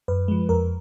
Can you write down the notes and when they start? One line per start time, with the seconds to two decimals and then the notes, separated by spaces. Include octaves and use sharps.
0.08 F#2 B4
0.28 F3 G#3
0.49 F2 A#4